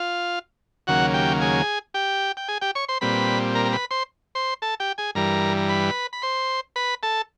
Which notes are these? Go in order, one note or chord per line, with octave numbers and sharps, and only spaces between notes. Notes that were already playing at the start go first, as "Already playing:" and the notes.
Already playing: F4 F5
D#2 C#3 F#3 A#3 F#4 F#5
G4 G5
G#4 G#5
G4 G5
G5
G#4 G#5
G4 G5
C#5 C#6
C5 C6
A#2 G3 C4 B4 B5
A#4 A#5
A#5
B4 B5
C5 C6
C5 C6
A4 A5
G4 G5
G#4 G#5
G2 E3 G3 A#4 A#5
A#5
B4 B5
B5
C5 C6
B4 B5
A4 A5